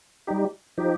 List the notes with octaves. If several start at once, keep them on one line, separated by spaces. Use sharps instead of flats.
G3 D#4 G4
F3 D#4 G4